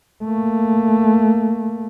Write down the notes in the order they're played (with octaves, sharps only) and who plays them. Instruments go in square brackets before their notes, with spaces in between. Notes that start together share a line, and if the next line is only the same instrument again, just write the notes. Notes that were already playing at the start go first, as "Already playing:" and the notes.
[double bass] A3 A#3